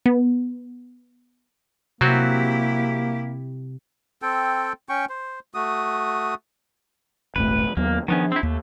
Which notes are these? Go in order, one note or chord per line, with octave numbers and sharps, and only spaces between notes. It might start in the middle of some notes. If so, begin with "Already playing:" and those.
B3
C3 F#3 A#3 C4 E4 F#4 G4
C4 A4 G5
C#4 G5 C#6
C5
A3 F#4 D#6
D#1 G#1 A3 B4
D#2 F#3 A#3 B3
D#3 F3 B3 C#4 D4
C4 E4
D#2 A3